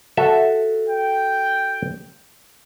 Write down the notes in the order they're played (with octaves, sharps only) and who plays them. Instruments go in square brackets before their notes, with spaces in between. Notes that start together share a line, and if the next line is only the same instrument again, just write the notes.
[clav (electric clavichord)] F#4 A4 E5
[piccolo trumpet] G5